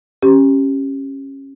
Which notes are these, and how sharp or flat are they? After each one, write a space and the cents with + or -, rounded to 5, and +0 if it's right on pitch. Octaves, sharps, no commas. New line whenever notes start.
C#4 -20 G4 +0